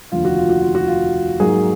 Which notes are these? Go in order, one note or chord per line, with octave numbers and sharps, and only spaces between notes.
F1 D#2 D3 F3 F4
F#4
F4
F#4
F4
F#4
F4
G#2 F#3 A#3 D#4 G#4